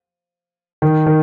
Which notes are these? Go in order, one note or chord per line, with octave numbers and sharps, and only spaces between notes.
D#3
D#3